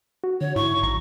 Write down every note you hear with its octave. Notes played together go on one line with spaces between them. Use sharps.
F#4
D3 C#5
G#2 E4 C#6
A#1 A#5